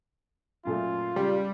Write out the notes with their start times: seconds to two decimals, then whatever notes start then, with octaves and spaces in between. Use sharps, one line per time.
0.65 F#2 A#2 A3 F4
1.16 C#2 G3